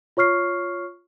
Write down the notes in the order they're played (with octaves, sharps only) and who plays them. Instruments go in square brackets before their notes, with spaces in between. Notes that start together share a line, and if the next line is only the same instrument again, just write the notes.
[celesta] F4 C#5 C#6 F6 C7